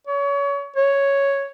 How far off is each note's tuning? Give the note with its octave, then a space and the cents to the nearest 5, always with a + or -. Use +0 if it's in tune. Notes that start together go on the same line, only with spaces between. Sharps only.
C#5 +30
C#5 +0